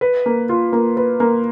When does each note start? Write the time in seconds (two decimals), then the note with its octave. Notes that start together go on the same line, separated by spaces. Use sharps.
0.01 B4
0.26 A#3
0.49 F4
0.73 A#3
0.97 B4
1.20 A#3